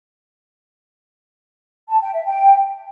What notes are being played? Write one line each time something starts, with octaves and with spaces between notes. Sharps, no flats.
A5
G5
E5
G5